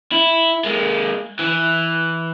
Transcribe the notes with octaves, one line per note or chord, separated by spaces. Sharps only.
E4
G#3 A#3
E3